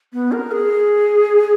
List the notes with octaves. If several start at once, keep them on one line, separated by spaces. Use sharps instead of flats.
B3
A#4
G#4